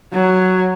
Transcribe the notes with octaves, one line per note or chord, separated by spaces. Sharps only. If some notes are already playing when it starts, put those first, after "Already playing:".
F#3